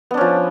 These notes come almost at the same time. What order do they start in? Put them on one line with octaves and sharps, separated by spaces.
B3 D4 C#4 F3